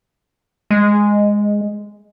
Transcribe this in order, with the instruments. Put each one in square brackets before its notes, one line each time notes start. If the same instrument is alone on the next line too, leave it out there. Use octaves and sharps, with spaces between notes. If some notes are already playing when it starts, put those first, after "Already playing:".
[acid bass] G#3